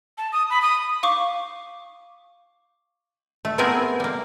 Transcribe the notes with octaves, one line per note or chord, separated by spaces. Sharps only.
A5
D#6
B5
D#6
F5 C#6 D6
A3
A3 B3 C4 E4 G#4 A#4
G3 A#3